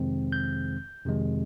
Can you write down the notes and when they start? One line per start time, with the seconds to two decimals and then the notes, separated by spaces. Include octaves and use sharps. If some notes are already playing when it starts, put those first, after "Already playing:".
Already playing: F2 C3 D#3 G#3 C4
0.32 G6
1.06 F2 C3 D#3 G#3